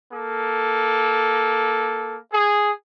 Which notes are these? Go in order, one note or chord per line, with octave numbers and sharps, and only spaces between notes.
A#3 A4
G#4